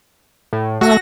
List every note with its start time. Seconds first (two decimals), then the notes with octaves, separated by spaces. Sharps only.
0.53 A2
0.81 A3 F#4 A#6